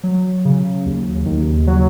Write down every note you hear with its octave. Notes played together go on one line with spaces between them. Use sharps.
F#3
C#3
D#2
D#2
F#3